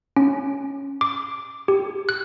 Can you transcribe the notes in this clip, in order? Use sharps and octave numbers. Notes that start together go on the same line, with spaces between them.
C#4
D6
G4
F#6